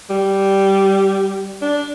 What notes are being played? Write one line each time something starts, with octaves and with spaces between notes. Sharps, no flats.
G3
D4